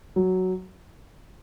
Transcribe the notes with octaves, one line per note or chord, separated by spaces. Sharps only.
F#3